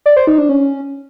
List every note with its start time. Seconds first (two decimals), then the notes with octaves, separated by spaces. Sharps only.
0.06 D5
0.16 C5
0.27 D#4
0.38 D4
0.49 C#4